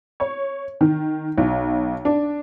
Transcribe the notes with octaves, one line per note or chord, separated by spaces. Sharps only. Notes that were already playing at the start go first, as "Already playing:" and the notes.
C#5
D#3
B1
D4